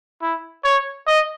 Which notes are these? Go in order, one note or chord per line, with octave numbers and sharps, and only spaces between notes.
E4
C#5
D#5